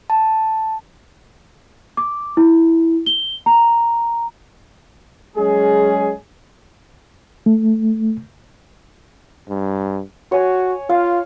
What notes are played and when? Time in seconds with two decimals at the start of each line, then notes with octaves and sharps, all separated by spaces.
0.10 A5
1.97 D6
2.37 E4
3.06 G7
3.46 A#5
5.37 F#3 G#3 C#4 G#4
7.46 A3
9.49 G2
10.32 F#4 C#5 G#5
10.89 F4 F5